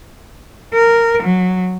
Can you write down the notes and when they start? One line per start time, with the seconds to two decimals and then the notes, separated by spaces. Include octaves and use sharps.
0.74 A#4
1.23 F#3